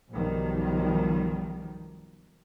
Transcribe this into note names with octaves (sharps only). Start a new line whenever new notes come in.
B1 F#2 D#3 F3 G3